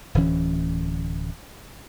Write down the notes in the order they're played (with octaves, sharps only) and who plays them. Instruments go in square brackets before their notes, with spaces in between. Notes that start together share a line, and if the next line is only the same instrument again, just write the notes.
[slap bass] D1 D2 E3 C#4